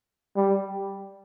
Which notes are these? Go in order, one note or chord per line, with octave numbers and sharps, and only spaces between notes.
G3